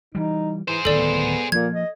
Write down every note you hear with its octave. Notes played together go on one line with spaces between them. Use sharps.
E3 G3 D#4
E3 G#4 C5
D1 D#3 B3 A4 D5
A#2 F3 A#3 G#6
D#5